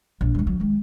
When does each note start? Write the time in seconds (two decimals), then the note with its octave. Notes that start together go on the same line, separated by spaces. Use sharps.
0.21 A#1
0.35 G2 G#3
0.47 F#3
0.60 D#3 G#3